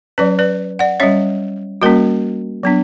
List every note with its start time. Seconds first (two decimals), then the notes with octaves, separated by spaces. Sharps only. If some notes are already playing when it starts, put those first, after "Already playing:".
0.18 F#3 C#4 B4 D5
0.39 B4 D5
0.79 D5 F#5
1.00 G3 C#4 C#5 E5
1.82 G3 A#3 C#4 F#4 A#4
2.63 F#3 B3 D4